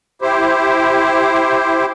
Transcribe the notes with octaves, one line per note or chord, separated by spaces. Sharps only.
E4 G4 C5